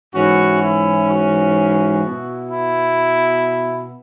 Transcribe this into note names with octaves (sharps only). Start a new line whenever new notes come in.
G#2 E3 C#4 E4 F#4
E4
F#4
B2 B3 E4
E4